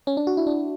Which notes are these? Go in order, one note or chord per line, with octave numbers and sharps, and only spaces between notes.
C#4
D4
F#4
E4
D4